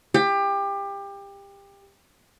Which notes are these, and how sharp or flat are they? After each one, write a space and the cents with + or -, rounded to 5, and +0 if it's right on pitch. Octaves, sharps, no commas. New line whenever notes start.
G4 +25